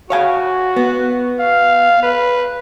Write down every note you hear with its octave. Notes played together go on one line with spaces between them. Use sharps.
F#4 C#5 F5 G#5
B3
F5
B4